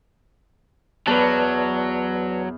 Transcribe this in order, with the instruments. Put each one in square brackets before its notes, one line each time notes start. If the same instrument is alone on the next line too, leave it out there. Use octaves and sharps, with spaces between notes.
[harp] E2 [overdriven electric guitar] F#3 [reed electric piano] B4 D5 A5